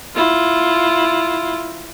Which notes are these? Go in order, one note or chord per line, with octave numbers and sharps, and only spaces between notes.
E4 F4